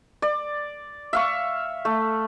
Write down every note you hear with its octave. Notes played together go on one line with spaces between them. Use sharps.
D5
E5 F5 C#6
A3